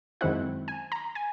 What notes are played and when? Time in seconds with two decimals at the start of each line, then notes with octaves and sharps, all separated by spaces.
0.21 F#2 D#3 G#3 C4 E4 F#5
0.68 G#5
0.92 A#5
1.15 G#5